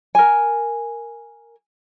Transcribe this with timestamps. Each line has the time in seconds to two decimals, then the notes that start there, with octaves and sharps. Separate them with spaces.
0.15 A#4 G#5